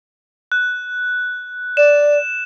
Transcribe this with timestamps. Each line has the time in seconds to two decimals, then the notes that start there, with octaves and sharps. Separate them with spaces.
0.52 F#6
1.77 D5 E7